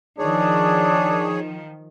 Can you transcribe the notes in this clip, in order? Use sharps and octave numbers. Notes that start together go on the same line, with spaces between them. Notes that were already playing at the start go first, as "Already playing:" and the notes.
D#3 F3 D4 G#4 C#5